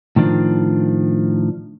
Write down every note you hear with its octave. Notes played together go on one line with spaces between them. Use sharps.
A2 D#3 F3 D4